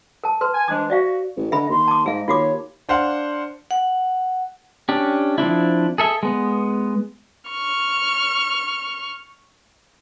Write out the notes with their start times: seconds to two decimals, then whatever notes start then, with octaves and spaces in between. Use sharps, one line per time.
0.24 A#4 A5
0.41 A#4 B4 C6
0.53 G#5
0.68 E3 G#3 D4 C5 D6
0.90 F#4 D5 E5 F5
1.36 A1
1.52 D3 D#5 E5 B5
1.69 D#2 C6
1.88 A5 D6
2.06 G#2 G#4 D#5 F5
2.28 D#2 F4 F#4 C#5 D6
2.89 D4 C5 F5 F#5
3.71 F#5
4.89 C#4 D4 G4
5.38 F3 C4 D4 E4
5.98 G#4 A4 E5
6.23 G#3 B3
7.50 C#6 F6